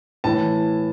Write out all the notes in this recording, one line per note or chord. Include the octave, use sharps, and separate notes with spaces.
A2 E3 A5